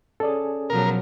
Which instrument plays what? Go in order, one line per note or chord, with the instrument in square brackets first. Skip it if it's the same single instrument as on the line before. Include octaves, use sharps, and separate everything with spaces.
[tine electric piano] C#4 G#4 [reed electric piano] A4 D5
[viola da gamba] B2 F3 F#3 [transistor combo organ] A#4